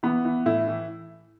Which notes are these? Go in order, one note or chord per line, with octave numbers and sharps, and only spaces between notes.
E3 B3
E3
A2 E4
E3